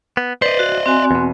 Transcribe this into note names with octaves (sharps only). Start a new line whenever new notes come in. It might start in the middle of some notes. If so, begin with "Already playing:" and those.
B3
B4 C5 D5 D#5
F#4
C4 F#4 G#5
E2 B2